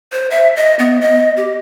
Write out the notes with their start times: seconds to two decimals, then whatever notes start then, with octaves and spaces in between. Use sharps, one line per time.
0.12 C5
0.31 E5
0.57 D#5
0.79 B3
1.01 D#5
1.37 G4